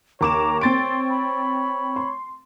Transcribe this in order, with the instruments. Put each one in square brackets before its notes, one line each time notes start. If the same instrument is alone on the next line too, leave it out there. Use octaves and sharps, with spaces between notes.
[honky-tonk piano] D#2 D6 E7 [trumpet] C#5 [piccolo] A#5
[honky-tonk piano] C4 A6 D7 [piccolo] C6
[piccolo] B5
[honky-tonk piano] C6